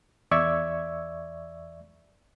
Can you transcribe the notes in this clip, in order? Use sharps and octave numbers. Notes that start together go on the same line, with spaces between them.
E2 D5 E5 C#6 E6 G#6